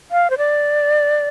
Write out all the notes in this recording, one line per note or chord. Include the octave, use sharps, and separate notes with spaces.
F5
C5
D5